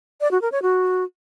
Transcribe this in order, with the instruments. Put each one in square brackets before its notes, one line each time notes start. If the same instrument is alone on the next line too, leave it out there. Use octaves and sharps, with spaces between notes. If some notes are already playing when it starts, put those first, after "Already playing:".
[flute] D5
F#4
A#4
C#5
F#4